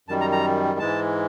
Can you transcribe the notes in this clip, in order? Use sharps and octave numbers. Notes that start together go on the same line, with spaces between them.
F#2 D#3 G3 A5
A#5
A#5
G#2 E3 G#3 A5